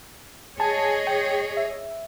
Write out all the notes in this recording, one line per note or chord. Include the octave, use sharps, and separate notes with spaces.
G#4 C#5 D#5 G#5 A5
G5
E5